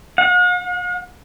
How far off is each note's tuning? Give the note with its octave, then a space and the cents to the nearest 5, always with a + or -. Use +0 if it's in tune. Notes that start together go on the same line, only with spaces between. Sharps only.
F#5 -45